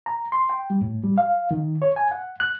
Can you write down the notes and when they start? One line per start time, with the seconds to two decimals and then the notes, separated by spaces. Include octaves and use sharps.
0.06 A#5
0.32 C6
0.49 G5
0.70 G3
0.81 A2
1.03 G3
1.18 F5
1.51 D#3
1.82 C#5
1.96 G#5
2.11 F#5
2.40 F#6